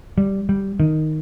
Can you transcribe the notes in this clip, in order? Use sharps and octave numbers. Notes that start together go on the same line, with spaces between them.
G3
G3
D#3